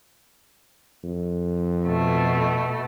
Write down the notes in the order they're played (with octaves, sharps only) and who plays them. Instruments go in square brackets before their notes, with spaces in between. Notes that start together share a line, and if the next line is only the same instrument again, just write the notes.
[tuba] F2
[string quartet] B2 A3